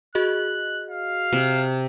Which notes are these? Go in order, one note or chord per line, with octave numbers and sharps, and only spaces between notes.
F#4 G#4 D#5 F#6
F5
C3